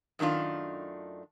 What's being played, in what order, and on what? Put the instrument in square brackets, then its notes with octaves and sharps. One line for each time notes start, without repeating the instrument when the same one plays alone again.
[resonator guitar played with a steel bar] F#2 D#3 A3 D4 F4